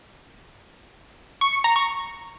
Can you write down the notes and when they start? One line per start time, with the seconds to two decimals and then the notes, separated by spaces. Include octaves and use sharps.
1.41 C#6
1.53 C#7
1.64 A#5
1.76 C#6